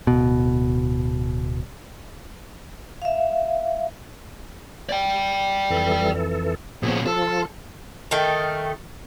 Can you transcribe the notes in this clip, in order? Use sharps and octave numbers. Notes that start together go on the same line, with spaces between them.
D1 B2
E5 F5
D5 G5
F2 E3 A4
A#2 F3 B3 C#4 G#4
F3 F4 A4
D#3 A3 G5